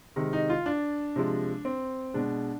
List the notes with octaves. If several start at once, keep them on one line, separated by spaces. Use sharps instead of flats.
C3 D#3 G#3
D#4
F4
D4
C3 F3 G#3
C4
B2 G#3 D4